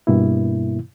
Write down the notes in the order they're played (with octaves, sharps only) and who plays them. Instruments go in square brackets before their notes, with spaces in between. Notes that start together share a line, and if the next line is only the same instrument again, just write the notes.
[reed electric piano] G2 B2 A#3 E4